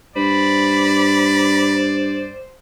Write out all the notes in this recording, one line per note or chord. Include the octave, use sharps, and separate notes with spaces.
G2 C5 D5 B5